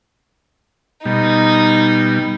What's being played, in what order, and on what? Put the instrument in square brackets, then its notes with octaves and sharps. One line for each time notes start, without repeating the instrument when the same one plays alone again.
[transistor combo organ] B2 G3 [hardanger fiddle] D#4